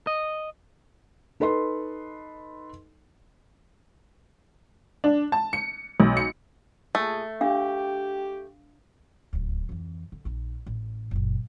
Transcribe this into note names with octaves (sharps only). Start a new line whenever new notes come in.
D#5
D#4 A4 B4 D#5 C6
D4
A5
C#7
B1
C#7
A#2 A3 G#4
D4 G4 F5
D1 C#2
F2 E3
D3
A#1 D#4
A1
F#1 A#2